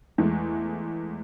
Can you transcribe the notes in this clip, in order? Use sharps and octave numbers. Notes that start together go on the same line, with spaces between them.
E2 G#3 A3